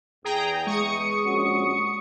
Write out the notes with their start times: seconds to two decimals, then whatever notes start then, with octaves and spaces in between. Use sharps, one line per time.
0.25 E2 G#4 G5 A#5 D#6
0.67 G#3 C#6 D#6 C#7
1.25 A#1 C#4 F#4